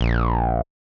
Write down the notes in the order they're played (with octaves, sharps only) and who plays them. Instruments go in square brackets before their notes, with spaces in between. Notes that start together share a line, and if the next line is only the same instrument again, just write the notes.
[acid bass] A#1